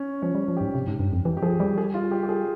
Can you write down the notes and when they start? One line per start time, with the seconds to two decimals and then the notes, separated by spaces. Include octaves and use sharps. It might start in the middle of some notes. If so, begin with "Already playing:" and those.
Already playing: C#4
0.22 F3 C#4
0.35 G3
0.48 F3
0.57 G#2 G4
0.75 C3
0.88 G#2
1.00 G2
1.13 F2
1.25 E3 G4
1.37 G4
1.42 F3 G#4
1.60 G3 G4
1.78 G#4
1.94 F4
2.11 G4
2.23 G4
2.29 G#4